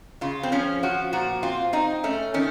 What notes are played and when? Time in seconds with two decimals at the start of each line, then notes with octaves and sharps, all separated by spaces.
0.21 C#3 F4
0.43 C4
0.52 F3 C#4
0.83 F3 F#4
1.13 A#2 F#4
1.43 C4 F4
1.73 C4 D#4
2.04 A3 C#4
2.34 D#3 C#4